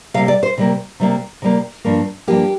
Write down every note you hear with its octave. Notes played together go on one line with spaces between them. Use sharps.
C3 G3 A#3 F5
D5
C5
C3 G3 A#3
C3 G3 A#3
C3 G3 A#3
G2 F3 A#3
G2 F3 A#3 G4